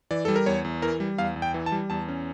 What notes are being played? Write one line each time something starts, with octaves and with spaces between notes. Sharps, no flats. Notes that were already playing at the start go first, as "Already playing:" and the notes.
E3 D5
G3 A4
A#4
E2 C#5
E2
E3 A#4
G3
E2 F5
E2
G5
E3
A5
G3
E2 A5
C#4